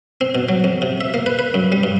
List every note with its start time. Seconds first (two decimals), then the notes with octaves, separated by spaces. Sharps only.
0.21 C4
0.35 B2
0.49 F#3
0.64 F2
0.82 C3
1.01 E5
1.14 A#3
1.26 B4
1.39 B4
1.54 F#2
1.72 G3
1.83 G2